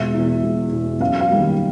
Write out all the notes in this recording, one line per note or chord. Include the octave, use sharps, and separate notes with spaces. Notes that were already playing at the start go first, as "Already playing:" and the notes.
Already playing: E1 E5
E2 B2
E1
E2 B2
F#2 F5
F5
D#3 G3 A#3